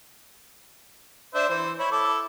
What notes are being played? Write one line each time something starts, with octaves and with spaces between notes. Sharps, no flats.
D4 C5 E5
E3 C5
E4 C#5 B5
E4 A4 D6